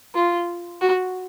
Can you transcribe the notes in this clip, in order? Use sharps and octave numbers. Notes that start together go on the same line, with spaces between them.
F4
F#4